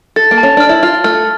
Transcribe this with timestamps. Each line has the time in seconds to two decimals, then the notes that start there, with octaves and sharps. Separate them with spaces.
0.16 A4 A6
0.31 A#3
0.38 A5
0.43 C#4
0.57 D4 F6
0.69 E4
0.83 F4 F6
1.04 A3 F6